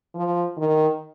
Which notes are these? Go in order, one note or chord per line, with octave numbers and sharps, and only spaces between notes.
F3
D#3